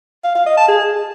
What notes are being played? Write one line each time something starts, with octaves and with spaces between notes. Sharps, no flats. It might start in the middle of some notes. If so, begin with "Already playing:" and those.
F5
F5
D#5
A5
G#4